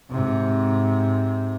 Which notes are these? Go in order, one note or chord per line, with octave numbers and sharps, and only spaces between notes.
G#2 C3